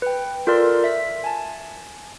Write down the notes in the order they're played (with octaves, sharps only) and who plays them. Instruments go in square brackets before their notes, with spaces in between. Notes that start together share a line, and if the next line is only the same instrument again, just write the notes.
[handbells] B4 G5
F4 A4 A#4 D5 C6
E5 B6
G#5 A5